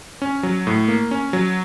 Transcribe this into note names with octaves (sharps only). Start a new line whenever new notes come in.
C#4
F#3
A2
A#3
C#4
F#3